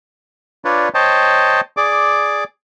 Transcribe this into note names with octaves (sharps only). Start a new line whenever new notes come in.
D4 F4 B4 C#5 D5
C5 C#5 D#5 G5 A5
G#4 D5 D6